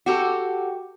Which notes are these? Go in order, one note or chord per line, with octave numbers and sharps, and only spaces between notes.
F#4 G4 A4